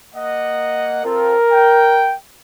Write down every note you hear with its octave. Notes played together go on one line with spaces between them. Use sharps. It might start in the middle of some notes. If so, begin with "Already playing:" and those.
A#3 D#5 F#5
C4 F4 A4 A#4
G5